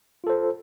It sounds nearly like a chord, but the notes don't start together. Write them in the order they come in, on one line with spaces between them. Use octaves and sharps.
F4 A4 C5